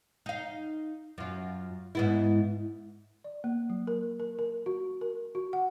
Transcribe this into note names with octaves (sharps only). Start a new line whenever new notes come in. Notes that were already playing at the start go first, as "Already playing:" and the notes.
D#4 F5
F#2 F4
G#2 B3 E4
D5
A#3
F#3
A#4
A#4
A#4
F#4
A#4
F#4
F#5